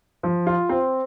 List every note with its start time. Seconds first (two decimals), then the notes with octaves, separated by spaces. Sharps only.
0.23 F3
0.47 F4
0.69 C4